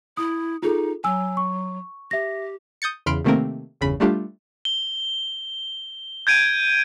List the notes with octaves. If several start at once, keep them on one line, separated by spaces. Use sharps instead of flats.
E4 D#6
D#4 F4 G#4 A4
F#3 G#5 E6
C#6
G4 E5 A#6
D#6 G6 A6 C#7
E2 C#3 B5 C6 F6 D7
C3 D#3 A3 A#3 C4 A#4
G1 E2 C#3 B5
G3 A3 D4 F4 G4
G7
G6 G#6 D7 D#7